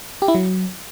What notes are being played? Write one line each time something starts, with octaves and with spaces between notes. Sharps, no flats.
G4
E4
F#3